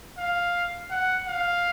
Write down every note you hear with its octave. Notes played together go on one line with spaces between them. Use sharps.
F5
F#5
F5